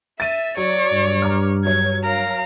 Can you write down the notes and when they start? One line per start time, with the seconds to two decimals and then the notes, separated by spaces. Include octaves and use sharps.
0.20 E5 A6 D#7
0.57 F#3 C#5 D5
0.92 G2
1.22 A#5 D6 F6
1.65 F#3 C#5 G#6
2.04 A#4 F5 A#5